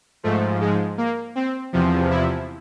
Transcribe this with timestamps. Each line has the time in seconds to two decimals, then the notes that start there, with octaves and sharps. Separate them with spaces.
0.23 G#2 F3 A3
0.61 G#3
0.98 A#3
1.35 C4
1.73 E2 C3 F3
2.10 E4